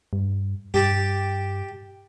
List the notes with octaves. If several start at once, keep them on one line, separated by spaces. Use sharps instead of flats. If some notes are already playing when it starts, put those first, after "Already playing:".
G2
G2 G4 A5